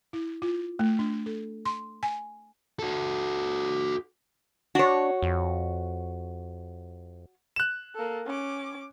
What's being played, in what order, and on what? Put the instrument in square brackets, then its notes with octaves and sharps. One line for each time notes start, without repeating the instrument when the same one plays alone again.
[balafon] E4
F4
A3
D4
A4
C6
G#5
[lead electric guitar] F#4 A4
[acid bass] D4 [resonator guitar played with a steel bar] F#4 C#5
[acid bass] F2
[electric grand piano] F#6 E7
[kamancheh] A#3 A4
C#4 D6